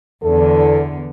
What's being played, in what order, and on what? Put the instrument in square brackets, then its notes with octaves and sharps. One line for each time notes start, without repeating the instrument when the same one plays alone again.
[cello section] E2 D3 [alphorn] A4